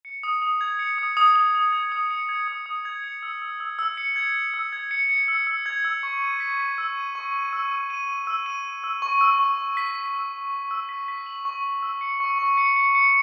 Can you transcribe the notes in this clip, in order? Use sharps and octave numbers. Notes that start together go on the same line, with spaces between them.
C#7
D#6
D#6
G#6
C#7
D#6
D#6
D#6
D#6
G#6
D#6
C#7
G#6
D#6
D#6
G#6
C#7
E6
E6
E6
E6
C#7
G#6
C#7
E6
G#6
C#7
C#7
E6
E6
G#6
E6
C#6
D#7
B6
B6
E6
D#7
C#6
D#7
E6
E6
D#7
D#7
E6
D#7
D#7
E6
C#6
E6
C#6
C#6
B6
B6
E6
C#6
C#6
E6
B6
B6
F#7
C#6
C#6
E6
C#7
C#6
C#6
C#7
C#7
C#7